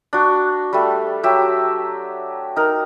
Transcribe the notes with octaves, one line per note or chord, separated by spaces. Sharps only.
D4 F#4
G3 A3
F#3 G4 E5
D#4 A#4